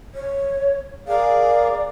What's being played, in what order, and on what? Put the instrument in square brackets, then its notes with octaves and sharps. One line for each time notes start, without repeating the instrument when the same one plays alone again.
[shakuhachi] C#5
[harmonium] G#4 A#4 F5 [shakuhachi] D5